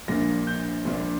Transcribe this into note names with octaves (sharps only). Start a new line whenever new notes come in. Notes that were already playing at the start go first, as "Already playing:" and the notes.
A#1 A#2 A#3 D4 A#6
G6
A#1 A#2 A#3 D4